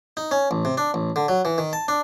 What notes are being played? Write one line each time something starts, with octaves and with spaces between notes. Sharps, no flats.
D#4
C#4
A1
C3
D4
A1
D3
F#3
E3
D#3
A5
D4